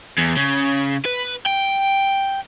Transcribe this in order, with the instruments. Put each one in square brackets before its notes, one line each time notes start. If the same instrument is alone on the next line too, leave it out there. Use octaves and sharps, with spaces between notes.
[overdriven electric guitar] E2
C#3
B4
G5